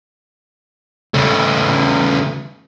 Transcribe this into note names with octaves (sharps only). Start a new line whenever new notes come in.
C#3 A3